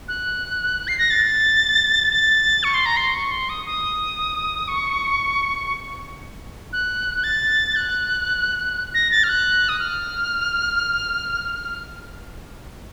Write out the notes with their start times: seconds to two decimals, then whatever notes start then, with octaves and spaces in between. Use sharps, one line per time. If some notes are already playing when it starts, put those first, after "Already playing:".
0.08 F#6
0.88 C7
0.98 A#6
1.10 A6
2.12 A6
2.64 C#6
2.74 C6
2.86 A#5
2.97 C6
3.14 C#6
3.31 C6
3.49 D#6
3.66 D#6
4.68 C#6
6.73 F#6
7.17 F#6
7.24 A6
7.76 F#6
8.94 A#6
9.11 A6
9.24 F6
9.29 F#6
9.69 D#6
9.79 F6